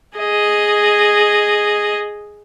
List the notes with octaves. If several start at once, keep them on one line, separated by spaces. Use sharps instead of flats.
G#4 D#5